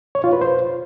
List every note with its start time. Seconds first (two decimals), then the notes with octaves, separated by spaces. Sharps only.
0.15 C#5
0.24 F4
0.33 B4
0.41 C5